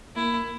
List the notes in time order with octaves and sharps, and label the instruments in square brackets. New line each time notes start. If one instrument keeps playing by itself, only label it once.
[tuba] A#3 [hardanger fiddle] E4